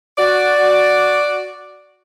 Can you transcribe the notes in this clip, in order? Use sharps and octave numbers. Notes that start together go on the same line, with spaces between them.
F#4 D5